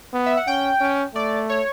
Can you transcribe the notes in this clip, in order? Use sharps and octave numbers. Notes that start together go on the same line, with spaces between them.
B3
E5
F#5
C#4 G5
C#4
A3 D5
C#5